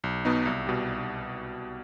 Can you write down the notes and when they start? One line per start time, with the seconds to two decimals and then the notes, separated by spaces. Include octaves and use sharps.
0.04 B1
0.25 B2 B3 D#4
0.46 C2
0.67 B2 G3